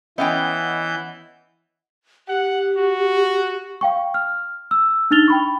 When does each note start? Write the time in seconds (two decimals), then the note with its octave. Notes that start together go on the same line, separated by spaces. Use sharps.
0.18 E3 B3 C#4 D#5 E5 F#5 G5 G6
2.28 G4 F#5
2.76 F#4
3.81 F5 G5 C#6
4.14 F6
4.71 E6
5.11 D4 D#4 F6 A6 F7 G7
5.28 G5 B5 C#6